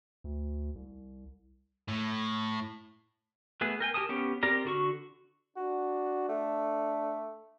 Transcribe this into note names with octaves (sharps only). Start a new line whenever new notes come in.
D2
C2
A2
A3 B3 G#4
A#4 G5 G#5
G4 A#4 G#5 A5 D#6
B3 C#4 G4
C4 G4 A#4 D5 A#5
D3 F#4 C#6
D4 F#4
A3